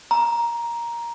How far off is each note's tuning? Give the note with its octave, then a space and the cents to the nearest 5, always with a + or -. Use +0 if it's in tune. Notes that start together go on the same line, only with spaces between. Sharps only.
A#5 +10